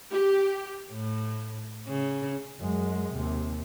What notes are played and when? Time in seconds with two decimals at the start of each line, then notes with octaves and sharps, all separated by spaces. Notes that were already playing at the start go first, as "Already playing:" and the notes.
0.12 G4
0.92 A2
1.88 C#3
2.60 F#2 G#3
3.13 D#2 C3